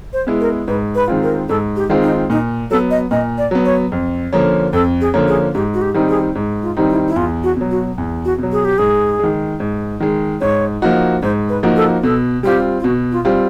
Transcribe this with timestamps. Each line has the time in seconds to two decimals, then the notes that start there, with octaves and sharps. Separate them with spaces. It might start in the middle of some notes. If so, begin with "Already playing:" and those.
0.13 C5
0.27 G#3 B3 E4
0.41 A#4
0.68 G#2 B4
0.95 B4
1.08 D#3 G#3 C4 F4
1.22 A#4
1.48 G#2 A4
1.76 G4
1.90 D#3 G#3 C4 F4
2.03 D#4
2.30 A#2 D#4
2.70 F#3 B3 A4
2.91 D#5
3.11 A#2 D#5
3.38 D5
3.51 F#3 B3
3.65 C#5
3.92 F2
4.33 D3 F3 A#3 C#4
4.73 F2 A4
5.01 G#4
5.14 D3 F3 A#3 C#4
5.28 G#4
5.54 G#2 G4
5.74 F#4
5.81 G4
5.94 D#3 G3 C4 D#4
6.09 G#4
6.35 G#2
6.63 F4
6.77 D#3 G3 C4 D#4
6.90 E4
7.08 E4
7.16 E2 F4
7.43 F#4
7.57 B2 F#3
7.71 F#4
7.98 E2
8.25 F#4
8.38 B2 F#3
8.52 G#4
8.65 G4
8.78 G#2 G#4
9.19 D#3 G#3
9.60 G#2
10.00 D#3 G#3
10.41 G#2 C#5
10.82 F3 A#3 D#4 F#4
11.22 G#2 C5
11.49 B4
11.63 F3 A#3 D#4 F#4
11.76 A4
12.03 B2 A4
12.43 G3 C4 F4 G4
12.80 F4
12.84 B2 F#4
13.12 F4
13.25 G3 C4 F4